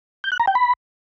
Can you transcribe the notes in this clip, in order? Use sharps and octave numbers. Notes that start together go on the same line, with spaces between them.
G6
F#6
A#5
G5
B5